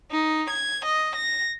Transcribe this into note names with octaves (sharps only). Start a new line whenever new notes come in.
D#4
G#6
D#5
A#6